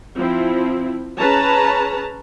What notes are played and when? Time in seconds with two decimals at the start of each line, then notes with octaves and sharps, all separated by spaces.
0.15 F3 C4 E4
1.18 C#4 G#4 B4 C#5 A5 A#5